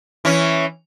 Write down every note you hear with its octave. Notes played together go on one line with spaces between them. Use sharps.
E3 C#4